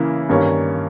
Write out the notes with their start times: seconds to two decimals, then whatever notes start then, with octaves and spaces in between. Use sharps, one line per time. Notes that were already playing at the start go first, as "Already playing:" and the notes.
Already playing: C#3 E3 A#3 E4
0.29 G2 D#3 A#3 C#4